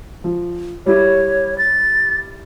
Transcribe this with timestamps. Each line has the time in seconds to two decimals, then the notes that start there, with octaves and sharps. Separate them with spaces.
0.24 F3
0.86 G3 E4 G4 C#5
1.58 A6